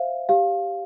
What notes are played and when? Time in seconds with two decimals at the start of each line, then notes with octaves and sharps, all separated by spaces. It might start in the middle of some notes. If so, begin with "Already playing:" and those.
Already playing: C5 E5 F5
0.29 G4 F5